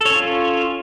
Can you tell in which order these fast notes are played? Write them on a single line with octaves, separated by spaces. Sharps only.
A4 C#5 C#4 F4